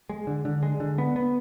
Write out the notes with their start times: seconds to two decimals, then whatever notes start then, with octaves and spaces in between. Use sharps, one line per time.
0.09 G#3
0.27 D3
0.45 D3
0.63 G#3
0.80 D3
0.98 B3
1.16 B3